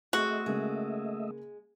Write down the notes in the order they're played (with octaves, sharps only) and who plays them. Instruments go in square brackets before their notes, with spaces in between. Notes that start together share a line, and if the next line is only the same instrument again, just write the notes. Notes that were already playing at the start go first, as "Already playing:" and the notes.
[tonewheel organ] A3 D#5 E5 [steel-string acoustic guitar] C4 G#4 [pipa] F#4
[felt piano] C#3 A#3 C#4 [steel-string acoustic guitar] G#3